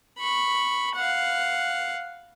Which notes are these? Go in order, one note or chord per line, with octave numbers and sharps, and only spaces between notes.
B5 C#6
F5 F#5